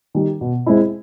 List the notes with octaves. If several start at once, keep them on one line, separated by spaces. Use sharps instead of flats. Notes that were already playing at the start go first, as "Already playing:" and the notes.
D#3 G3
B2
G#3 C4 E4